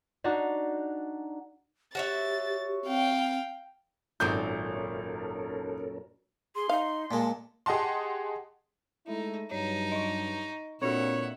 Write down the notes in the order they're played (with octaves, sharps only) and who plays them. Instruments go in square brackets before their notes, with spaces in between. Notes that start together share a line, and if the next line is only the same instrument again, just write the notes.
[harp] D4 D#4 F#4
[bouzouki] F#4 C#5 E5 [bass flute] G4 [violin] A6
[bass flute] C4 [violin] F5 G5
[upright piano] G#1 G6 [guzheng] F#2 A#2 F#4 [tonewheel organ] C#4 A4 A#4
[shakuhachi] G#4 [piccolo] C6
[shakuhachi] D#4 [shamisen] F5
[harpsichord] A#2 G#3 [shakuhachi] A5
[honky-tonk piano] G4 G#4 D#5 F#5 A5 C6
[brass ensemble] G#3 A3 E4 [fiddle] D#4
[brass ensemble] G2 F#3 D4 [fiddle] D#4 [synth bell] C#5
[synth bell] D#5 C#6
[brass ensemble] A#2 [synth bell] C4 D4 F#4 [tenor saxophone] C#5 [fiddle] E5 F#5